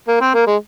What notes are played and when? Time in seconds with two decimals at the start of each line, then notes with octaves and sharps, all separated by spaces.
0.08 A#3
0.21 C4
0.34 A#3
0.47 G#3